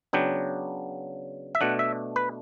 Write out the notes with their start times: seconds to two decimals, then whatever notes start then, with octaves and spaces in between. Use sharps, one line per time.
0.13 C#3 F#3 B3 D4 G5
1.55 E5
1.61 B2 A3 D4 F#5
1.79 E5
2.16 B4